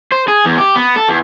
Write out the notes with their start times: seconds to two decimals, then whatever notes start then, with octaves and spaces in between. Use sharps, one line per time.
0.12 C5
0.28 G#4
0.45 E2
0.58 G4
0.76 B3
0.96 A4
1.09 E2